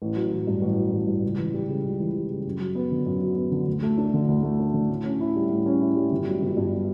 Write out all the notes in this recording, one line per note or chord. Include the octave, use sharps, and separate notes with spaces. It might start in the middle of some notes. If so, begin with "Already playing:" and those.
A1
F#3
A1
G2
A1
F#3
A1
G2
C#2
E3
G3
C#3
C#2
E3
G3
C#3
F#2
F#3
B3
D3
F#2
F#3
B3
D3
D2
A3
D4
D3
D2
A3
D4
D3
A2
C#4
E4
G3
A2
C#4
E4
G3
G1
F#3
G1
G2